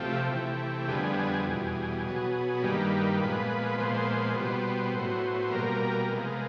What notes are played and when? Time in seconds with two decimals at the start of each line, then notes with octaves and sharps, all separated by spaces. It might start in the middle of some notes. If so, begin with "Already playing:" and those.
Already playing: C3 F3 A3 G4
0.30 C3 E3 A3
0.88 F2 D3 G3 B3 G#4
1.47 E2 B2 G3
2.04 B2 F#3 B3
2.62 G2 D#3 G3 A#3 B4
3.20 A#2 F3 G#3 B3
3.78 A#2 F3 G#3 B3 C5
4.36 B2 G3 B3
4.94 A2 F#3 B3
5.52 B2 G3 A#3 A#4
6.10 C3 F3 G#3 B3